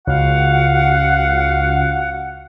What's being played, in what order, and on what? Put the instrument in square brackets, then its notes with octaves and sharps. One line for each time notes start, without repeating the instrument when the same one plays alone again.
[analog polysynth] C#2 [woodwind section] F#4 F5 F#5